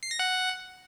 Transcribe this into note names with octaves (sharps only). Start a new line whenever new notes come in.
C7
A#6
F#5